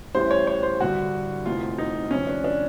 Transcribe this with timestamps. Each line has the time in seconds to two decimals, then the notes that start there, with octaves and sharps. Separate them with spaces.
0.15 A1 A2 E3 G3 C5
0.31 C#5
0.47 C#5
0.63 C5
0.80 G1 G2 D3 F#4
1.46 F1 E2 C3 F4
1.78 D#4
2.11 G1 F2 C3 F3 C#4
2.27 D4
2.44 D4